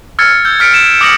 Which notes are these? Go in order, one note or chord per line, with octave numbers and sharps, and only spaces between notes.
E6 F6 G#6 A6 C#7
E6 G6
F6 G#6 B6 C#7 D7
E7
D6 D#6 F6 A#6 C#7 F#7